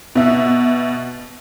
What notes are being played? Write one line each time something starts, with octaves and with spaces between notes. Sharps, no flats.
B2 E5